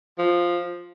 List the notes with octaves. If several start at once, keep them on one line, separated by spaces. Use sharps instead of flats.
F3